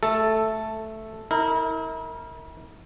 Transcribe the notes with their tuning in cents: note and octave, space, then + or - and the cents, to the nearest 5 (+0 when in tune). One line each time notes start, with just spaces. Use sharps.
A3 +0 A4 +0
E4 -40 A#4 -20